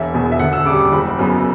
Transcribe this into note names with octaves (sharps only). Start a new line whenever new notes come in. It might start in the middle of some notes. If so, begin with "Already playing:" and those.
Already playing: E1 E5
E2 B2
E5
D2 F#5
E6
C#3 D6
G3
D6
F#1 B5
F#2 C#3 F#3 B3